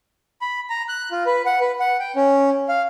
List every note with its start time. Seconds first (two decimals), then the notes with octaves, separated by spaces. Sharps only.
0.42 B5
0.70 A#5
0.89 F#6
1.11 F4
1.26 B4
1.46 F#5
1.60 B4
1.79 F#5
2.00 G5
2.16 C#4
2.69 F5